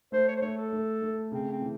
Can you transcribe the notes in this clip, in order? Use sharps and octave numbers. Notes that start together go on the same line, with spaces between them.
A3 C5
C#5
C5
A3 C#5
A4
A3
A3
C#3 C4
C4
E3